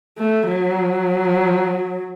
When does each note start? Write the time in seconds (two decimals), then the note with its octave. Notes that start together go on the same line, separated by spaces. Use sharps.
0.18 A3
0.47 F#3